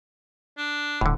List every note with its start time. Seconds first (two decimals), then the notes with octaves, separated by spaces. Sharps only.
0.58 D4
1.01 D#1 A2 D3